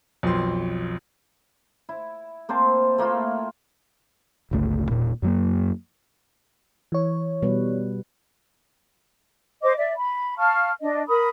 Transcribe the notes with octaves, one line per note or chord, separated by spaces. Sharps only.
B1 F2 F3 C6
E4
A#3 C4 C5 A5
A3 A#3 E4 F4
G1 C#2 A3
E1 A#2
F#2 F#3 A#3
E3 C#5
B2 G3 B4
C5 D#5 D6
D5 E5
B5
F5 A5 C#6 F6
D4 D#5
A#4 B5 D#6